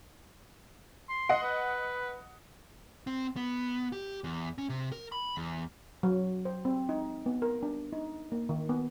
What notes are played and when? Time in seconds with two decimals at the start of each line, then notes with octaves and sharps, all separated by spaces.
1.09 C6
1.29 D#5 F#5
1.42 B4
3.07 C4
3.36 B3
3.92 G4
4.24 E2
4.58 C#4
4.69 C3
4.92 A#4
5.12 B5
5.37 E2
6.03 F#3
6.45 C5
6.65 C4
6.89 D#4
7.26 B3
7.42 A#4
7.63 D4
7.93 D#4
8.32 A#3
8.49 D#3
8.69 B3